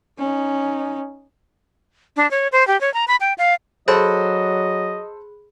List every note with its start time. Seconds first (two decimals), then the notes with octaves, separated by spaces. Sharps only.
0.18 C#4 D#4
2.17 D4
2.31 C#5
2.52 C5
2.67 G4
2.81 C#5
2.94 A#5
3.08 B5
3.20 G5
3.38 F5
3.88 F#3 G#4 A4 C5 D#5 B5 F#6